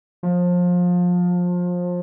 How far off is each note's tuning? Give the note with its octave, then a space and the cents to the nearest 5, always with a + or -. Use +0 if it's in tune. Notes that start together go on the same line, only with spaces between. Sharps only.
F3 +25